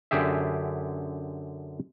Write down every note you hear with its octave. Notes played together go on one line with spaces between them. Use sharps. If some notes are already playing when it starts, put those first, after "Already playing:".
F#2 D3 G4 G#4 E5